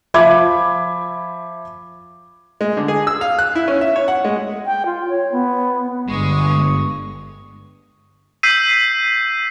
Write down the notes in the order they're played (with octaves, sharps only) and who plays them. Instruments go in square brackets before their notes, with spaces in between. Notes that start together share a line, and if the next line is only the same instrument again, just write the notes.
[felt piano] F3 E5 B5 D6 G#6
[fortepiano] G#3
D3
G#4
E6
F5
F#6
E4
C#4
E5
C#5
F#5
G#3
[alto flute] G5
F4
C#5
B3
[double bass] G1 G2 [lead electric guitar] G#3 [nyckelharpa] C#6 D#6
[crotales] E6 G6 B6 C7 D#7